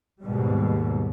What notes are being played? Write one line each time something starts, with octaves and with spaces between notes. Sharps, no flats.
D#2 G#2 B2 G3